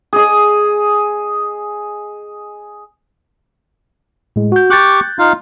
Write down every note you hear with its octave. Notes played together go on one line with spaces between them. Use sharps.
G#4 D#5
A2 G#3
F#4 G6
G4 C#6 D6 F#6 G6 A6
D#4 F4 F5